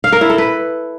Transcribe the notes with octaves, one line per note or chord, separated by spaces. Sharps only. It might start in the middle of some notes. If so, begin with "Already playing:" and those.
F5
A#4
E4
A4
B4